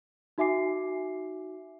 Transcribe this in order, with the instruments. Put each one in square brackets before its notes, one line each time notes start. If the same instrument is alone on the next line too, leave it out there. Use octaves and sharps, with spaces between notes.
[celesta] D#4 F#4 E5 G#5 D6 C7